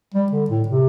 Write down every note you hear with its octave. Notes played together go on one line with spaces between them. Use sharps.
G3
D3
A2
C3